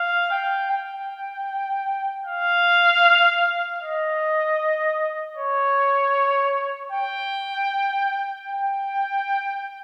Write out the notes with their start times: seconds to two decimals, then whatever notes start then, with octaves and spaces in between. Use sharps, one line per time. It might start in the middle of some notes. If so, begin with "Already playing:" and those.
Already playing: F5
0.31 G5
0.70 G5
2.25 F5
3.81 D#5
5.37 C#5
6.92 G5
8.48 G5